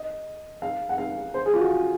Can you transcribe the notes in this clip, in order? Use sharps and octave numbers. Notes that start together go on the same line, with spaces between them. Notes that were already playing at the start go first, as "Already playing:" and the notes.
Already playing: D#5
F5
F#5
F5
C5
G#4
F4
F#4